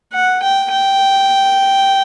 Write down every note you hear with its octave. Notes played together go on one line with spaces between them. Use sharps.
F#5
G5
G5